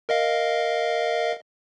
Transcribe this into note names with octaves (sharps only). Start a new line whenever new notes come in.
A#4 D#5 F5